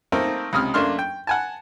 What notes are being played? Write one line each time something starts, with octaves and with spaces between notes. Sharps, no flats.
A3 A#3 C4 D#4 A4 A#4
C#2 C3 D#6 F6
F#2 A3 A#3 D4 C6 F6
G5
F#5 G#5 A5